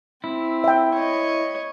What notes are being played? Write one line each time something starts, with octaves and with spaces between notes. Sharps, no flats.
C4 E4
E5 G5
C#5 D#5